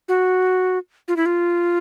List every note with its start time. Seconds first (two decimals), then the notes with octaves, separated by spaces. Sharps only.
0.08 F#4
1.08 F4
1.16 E4
1.26 F4